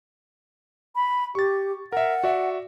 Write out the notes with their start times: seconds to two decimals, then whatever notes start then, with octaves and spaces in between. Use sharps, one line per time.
0.95 B5
1.35 G4 C#6 A6
1.92 A#4 E5 F#5
2.24 F#4 D5 E5